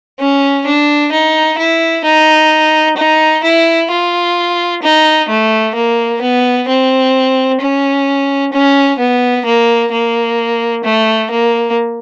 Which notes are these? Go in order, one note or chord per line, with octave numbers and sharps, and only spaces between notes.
C#4
D4
D#4
E4
D#4
D#4
E4
F4
D#4
A3
A#3
B3
C4
C#4
C#4
B3
A#3
A#3
A3
A#3